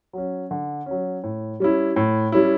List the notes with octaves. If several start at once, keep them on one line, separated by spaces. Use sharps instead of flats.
F#3 C#4
D3
F#3 C#4
A2
G3 C#4 E4
A2
G3 C#4 E4